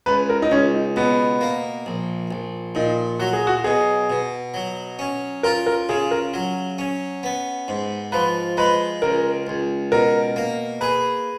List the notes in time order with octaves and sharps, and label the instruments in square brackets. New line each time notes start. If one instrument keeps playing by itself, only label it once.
[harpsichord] C#2 [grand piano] B4
[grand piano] A#4
D#4
[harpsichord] C#2 [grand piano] C#4
[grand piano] D#4
[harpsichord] B2 [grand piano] B3
[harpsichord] A#3
A#1
A#1
[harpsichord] A#2 [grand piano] D#4
[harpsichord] F#3 [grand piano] F#4
[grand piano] G#4
F#4
[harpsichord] B2 [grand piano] G#4
[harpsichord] B2
F#3
C#4
[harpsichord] F4 [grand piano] A#4
[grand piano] A#4
[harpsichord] C#3 [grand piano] G#4
[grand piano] A#4
[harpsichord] F#3
C#4
B3
G#2
[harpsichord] F3 [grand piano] B4
[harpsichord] G#3 [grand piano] B4
[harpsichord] C#2 [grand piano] A#4
[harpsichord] C#2
[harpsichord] B2 [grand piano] A#4
[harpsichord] A#3
[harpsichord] G#4 [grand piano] B4